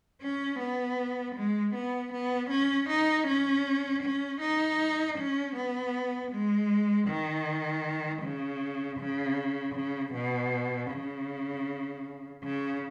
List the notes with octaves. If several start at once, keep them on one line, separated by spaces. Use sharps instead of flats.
C#4
B3
G#3
B3
B3
C#4
D#4
C#4
C#4
D#4
C#4
B3
G#3
D#3
C#3
C#3
C#3
B2
C#3
C#3